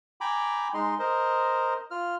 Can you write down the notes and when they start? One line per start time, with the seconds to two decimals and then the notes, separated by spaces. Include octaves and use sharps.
0.21 G5 G#5 A#5 B5 D6
0.74 G#3 D#4 D#5 C6
0.99 A#4 C5 D#5
1.91 F4 F6